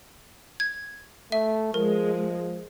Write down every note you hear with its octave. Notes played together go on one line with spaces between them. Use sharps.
G#6
A3 E5
F3 G#3 A#4